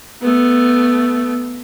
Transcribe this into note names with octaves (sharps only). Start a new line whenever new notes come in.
A3 B3